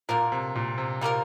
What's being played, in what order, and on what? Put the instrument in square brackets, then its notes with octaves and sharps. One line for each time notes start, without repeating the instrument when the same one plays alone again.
[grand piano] A#2 [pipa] D3 A#3 F4 A#4
[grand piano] C3
A#2
C3
[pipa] G3 A#3 F4 A#4